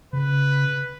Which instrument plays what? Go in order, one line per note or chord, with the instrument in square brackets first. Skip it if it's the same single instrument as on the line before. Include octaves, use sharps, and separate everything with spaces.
[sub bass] C#3 [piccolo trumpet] B4